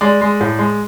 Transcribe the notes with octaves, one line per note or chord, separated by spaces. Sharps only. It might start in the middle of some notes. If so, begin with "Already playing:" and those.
G#3 D5
G#3
A2
G#3